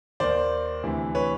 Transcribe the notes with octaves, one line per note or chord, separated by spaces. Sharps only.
D#2 D#3 C5 D5
D2 C3 E3
B4 C#5